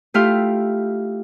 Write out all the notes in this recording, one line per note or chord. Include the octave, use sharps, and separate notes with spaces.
A3 E4 F4 G4 F5